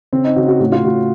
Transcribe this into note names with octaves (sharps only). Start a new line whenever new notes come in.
C#3 C4
D#4
C#3 F#4
F#4
A2 F#4
F4
A2 F#4